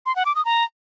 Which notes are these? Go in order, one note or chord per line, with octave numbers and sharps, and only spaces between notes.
C6
F#5
D6
D#6
A#5